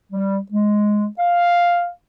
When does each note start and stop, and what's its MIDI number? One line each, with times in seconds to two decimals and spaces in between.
0.12 0.38 55
0.51 1.04 56
1.18 1.87 77